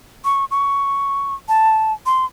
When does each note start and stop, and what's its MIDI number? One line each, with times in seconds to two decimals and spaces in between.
0.25 0.45 85
0.51 1.34 85
1.49 1.93 81
2.06 2.25 84